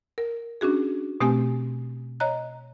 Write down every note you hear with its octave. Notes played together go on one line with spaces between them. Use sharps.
A#4
C#4 D4 F#4 G#4
B2 A3 C4 G4 G#5 D#6
C#5 D#5 A#5 F#6